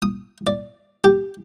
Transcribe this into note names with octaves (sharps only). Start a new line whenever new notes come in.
D#6
D5
G4